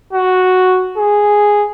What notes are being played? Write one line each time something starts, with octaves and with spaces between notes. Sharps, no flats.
F#4
G#4